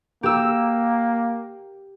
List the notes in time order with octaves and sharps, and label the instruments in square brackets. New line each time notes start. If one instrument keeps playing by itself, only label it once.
[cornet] A#3 [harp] G4 E6